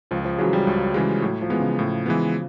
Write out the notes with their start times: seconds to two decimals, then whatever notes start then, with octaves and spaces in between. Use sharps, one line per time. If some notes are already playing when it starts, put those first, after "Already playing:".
0.11 C#2 F3
0.25 F3
0.38 C#3 E3 F#3 G#3
0.53 G3
0.67 C#2
0.94 C#3 E3 G#3
1.22 A2 F#3
1.42 F3
1.50 E3 G#3 B3
1.60 C#3
1.79 A2
2.06 E3 G#3 B3